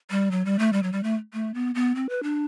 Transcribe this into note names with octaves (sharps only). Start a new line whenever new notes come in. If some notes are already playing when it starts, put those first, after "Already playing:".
G3
F#3
G3
A3
G3
F#3
G3
A3
A3
B3
B3
C4
B4
D4